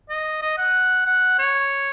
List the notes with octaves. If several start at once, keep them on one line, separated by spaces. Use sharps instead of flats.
D#5
D#5
F#5
F#5
C#5